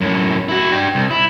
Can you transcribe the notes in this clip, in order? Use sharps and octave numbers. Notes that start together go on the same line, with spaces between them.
F#2 A2
E4 F#4
D4 G5
C2
E4